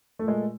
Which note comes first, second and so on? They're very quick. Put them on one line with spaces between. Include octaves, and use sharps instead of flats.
A3 A#2 G#3